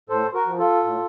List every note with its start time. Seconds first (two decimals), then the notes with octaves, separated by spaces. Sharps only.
0.09 A2 A4 C5
0.34 F#4 A#4
0.46 F3
0.59 F4 A4
0.84 A2